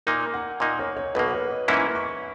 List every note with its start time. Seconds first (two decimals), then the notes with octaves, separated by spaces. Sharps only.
0.07 A#2 A#3 D#4 A#4
0.34 F#5
0.60 A#2 A#3 D#4 D#5
0.79 C#5
0.97 C#5
1.15 B1 B2 A#3 B4
1.33 C#5
1.50 D#5
1.68 G#2 E3 A#3 C#4 E4 E5
1.95 C#6